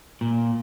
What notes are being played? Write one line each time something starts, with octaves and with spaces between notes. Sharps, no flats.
A#2